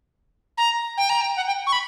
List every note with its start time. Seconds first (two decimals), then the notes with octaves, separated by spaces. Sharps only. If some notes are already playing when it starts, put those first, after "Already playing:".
0.58 A#5
0.97 G5
1.09 A#5
1.21 G5
1.36 F#5
1.47 G5
1.67 C#6
1.72 B5